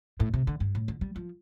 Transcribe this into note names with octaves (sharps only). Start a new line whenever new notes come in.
A2
C3
D3
G2
A2
D3
G3
F3